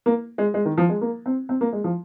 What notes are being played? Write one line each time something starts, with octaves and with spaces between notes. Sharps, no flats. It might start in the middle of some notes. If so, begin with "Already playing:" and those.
A#3
G#3
G#3
D#3
F3
G#3
A#3
C4
C4
A#3
G#3
F3